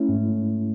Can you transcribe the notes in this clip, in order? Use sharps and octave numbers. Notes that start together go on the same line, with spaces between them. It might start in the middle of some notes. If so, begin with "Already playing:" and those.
Already playing: A3 C#4 E4
G#2